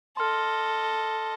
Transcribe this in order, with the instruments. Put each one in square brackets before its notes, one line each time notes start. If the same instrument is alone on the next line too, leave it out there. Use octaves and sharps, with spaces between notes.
[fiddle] A4 D#5 [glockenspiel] C6 F6